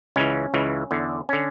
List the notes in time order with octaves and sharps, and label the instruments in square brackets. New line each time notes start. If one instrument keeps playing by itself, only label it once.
[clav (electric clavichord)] C#2 C#3 E3 C#4
C#2 C#3 E3
E2 D3
D3 C#4